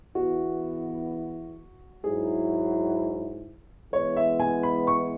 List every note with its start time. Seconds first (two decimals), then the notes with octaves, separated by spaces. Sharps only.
0.15 E2 E3 B3 E4 F#4
2.04 G#2 F#3 E4 G#4
3.92 E3 G#3 B3 E4 C#5
4.17 E5
4.40 G#5
4.63 B5
4.87 C#6